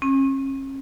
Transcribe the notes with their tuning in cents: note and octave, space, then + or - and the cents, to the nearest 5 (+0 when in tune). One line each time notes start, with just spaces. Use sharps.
C#4 -40